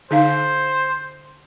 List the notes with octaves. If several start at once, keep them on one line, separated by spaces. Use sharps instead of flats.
D3 D#4 C5 F5